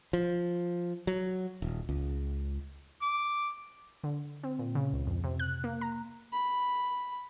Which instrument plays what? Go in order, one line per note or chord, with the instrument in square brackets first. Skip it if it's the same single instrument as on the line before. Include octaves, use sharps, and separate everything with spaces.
[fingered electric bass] F3
F#3
D#1
C#2
[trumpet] D6
[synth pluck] D3
C4
A#2
C#3
C#2
F2
C3
F#6
A#3
A#5
[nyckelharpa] B5